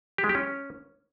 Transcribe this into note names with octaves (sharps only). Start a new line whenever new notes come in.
G4
G#3
G4
C#4